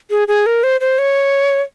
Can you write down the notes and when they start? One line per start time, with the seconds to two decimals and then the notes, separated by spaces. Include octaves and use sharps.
0.11 G#4
0.28 G#4
0.46 A#4
0.63 C5
0.81 C5
0.99 C#5